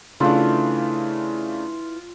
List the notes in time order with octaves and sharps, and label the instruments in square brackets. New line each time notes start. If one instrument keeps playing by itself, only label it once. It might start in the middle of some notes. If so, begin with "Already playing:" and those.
[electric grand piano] C#3 A3 D4 [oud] E3 E4 [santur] F4